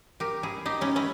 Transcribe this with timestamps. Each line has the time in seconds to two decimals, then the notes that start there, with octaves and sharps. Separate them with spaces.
0.20 G4 A#4
0.43 E4 G#4
0.66 D#4 G4
0.81 C#4 E4
0.96 C#4 E4